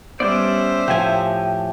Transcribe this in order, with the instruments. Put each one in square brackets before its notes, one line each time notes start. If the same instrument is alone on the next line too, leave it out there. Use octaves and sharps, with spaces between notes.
[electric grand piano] G3 B3 [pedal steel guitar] C#4 D4 D5 [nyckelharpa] C5 E5
[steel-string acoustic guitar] A2 F3 [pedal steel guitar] G4 G#5 [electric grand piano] F5 G5